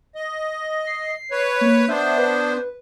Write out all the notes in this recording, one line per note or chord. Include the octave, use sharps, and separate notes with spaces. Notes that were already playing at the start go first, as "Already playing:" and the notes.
D#5
C7
B4 C#5
A#3
B3 D4 C5 E5
B4